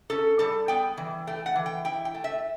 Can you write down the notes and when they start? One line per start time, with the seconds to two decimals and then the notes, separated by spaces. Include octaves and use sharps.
0.10 C#4 A4
0.39 G3 A4
0.68 B3 G5
0.97 E3
1.27 A3 G5
1.46 F#5
1.56 E3
1.66 G5
1.85 E4 G5
2.05 G5
2.14 A3
2.24 E5